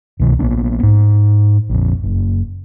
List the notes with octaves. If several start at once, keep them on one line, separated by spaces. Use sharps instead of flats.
C2 B2 D#3
A#1 A#3 B3 D4
G#2
A#1 F2
F#1